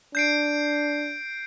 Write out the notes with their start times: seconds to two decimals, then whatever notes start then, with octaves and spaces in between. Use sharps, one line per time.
0.15 D4 G6 C7 D7